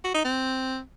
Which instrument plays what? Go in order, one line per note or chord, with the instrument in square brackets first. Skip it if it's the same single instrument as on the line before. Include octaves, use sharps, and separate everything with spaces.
[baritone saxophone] F#4
D#4
C4